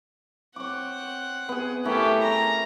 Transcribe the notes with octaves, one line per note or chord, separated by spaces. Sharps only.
C4 C#5 F#5 D6
B3 G#4
A3 C#4 E4 G4 A#4
C#5 G#5 A#5